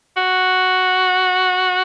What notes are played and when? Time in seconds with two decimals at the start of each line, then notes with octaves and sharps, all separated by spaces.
0.17 F#4